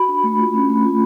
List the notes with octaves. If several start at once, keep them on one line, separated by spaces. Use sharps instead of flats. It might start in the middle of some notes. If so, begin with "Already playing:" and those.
Already playing: F#4 B5
D4
A3
F4
C#4
A3
F4